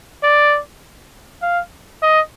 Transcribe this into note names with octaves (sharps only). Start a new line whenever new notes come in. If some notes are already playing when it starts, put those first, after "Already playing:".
D5
F5
D#5